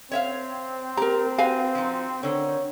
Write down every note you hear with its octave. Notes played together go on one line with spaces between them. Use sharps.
C4 C#5 E5 F5
G4 A#4 A#5
F#4 B4 F5 G#5
F3 D#4
D3 D#3 C#5